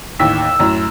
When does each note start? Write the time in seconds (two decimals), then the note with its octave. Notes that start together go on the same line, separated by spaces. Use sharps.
0.19 A1 D#2 E6 B6
0.60 F#2 A2